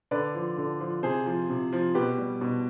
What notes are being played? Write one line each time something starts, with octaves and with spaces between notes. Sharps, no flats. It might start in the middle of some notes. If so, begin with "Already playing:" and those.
D3 B4 D5
F3
D3
F3
C3 G#4 C5
F3
C3
F3
B2 G4 B4
G3
B2